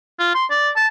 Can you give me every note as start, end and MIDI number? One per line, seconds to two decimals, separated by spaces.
0.20 0.35 65
0.35 0.45 84
0.51 0.70 74
0.76 0.87 81